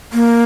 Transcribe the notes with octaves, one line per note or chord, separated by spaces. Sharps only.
A#3